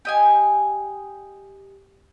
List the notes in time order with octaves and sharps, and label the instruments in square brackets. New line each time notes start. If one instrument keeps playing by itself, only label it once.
[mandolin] G4 D#5 G#5